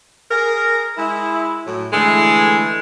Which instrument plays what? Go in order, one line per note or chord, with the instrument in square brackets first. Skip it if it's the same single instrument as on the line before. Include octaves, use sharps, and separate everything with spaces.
[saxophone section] G#4 A#4
G#3 E4
A2 F#3
[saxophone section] D3 E3 A3 [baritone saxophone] G#3